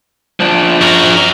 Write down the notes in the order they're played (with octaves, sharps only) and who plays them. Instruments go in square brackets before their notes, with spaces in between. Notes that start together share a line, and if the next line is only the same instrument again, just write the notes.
[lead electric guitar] F3 D4
[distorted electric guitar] F#4 A#4